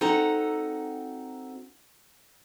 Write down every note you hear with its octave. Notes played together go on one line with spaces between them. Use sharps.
C4 D#4 F#4 A4 F#5 A#5